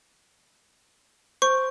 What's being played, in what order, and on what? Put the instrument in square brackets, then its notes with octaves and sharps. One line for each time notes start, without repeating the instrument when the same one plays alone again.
[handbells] C5 [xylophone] C#6